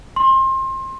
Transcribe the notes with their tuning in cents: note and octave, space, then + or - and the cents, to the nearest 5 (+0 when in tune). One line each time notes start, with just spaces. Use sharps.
C6 +30